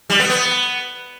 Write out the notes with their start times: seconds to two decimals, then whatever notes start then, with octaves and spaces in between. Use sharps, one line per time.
0.10 G3
0.20 B3
0.30 B3